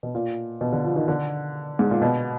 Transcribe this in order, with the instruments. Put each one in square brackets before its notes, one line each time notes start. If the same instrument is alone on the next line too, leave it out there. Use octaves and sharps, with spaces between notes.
[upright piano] B2
A#2
B2
D3
F3
D#3
D3
G#2
A#2
B2